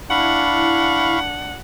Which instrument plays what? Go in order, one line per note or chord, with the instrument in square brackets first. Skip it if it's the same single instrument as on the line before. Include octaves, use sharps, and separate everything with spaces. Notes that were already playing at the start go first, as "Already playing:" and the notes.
[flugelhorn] D4 [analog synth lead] E4 [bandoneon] F5 B5 C#6 [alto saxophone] F#5